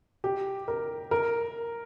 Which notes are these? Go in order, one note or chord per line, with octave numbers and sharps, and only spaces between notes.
G4
A#4
A#4